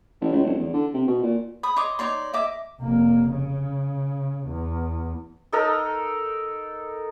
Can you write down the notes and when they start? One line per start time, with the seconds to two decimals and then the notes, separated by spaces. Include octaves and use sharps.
0.21 A1
0.32 C#2
0.44 D1
0.59 E2
0.73 D3
0.94 C3
1.08 B2
1.23 A#2
1.63 B5 D#6
1.76 C#5 D#5 C6 D6
1.99 D#4 C#5 D5 C6
2.33 D#5 E5 D6
2.81 F1 A#3
3.31 C#3
4.47 E2
5.52 D#4 A4 A#4 D#5